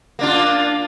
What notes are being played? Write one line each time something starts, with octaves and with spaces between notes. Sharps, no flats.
A#3 D4 F4